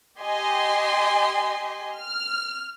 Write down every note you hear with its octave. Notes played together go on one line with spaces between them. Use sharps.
G4 D#5 G#5 C6
F6